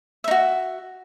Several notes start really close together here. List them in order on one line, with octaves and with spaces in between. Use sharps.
E5 D#4 F#4